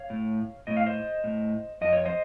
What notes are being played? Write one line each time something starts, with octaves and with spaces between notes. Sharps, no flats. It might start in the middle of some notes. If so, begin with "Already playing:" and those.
Already playing: C#5 F5
A2
A2 D#5
F5
C5 D#5
A2
F2 D#5
C#5
C5 D#5